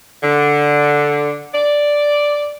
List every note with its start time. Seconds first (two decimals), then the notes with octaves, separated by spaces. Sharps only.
0.22 D3
1.53 D5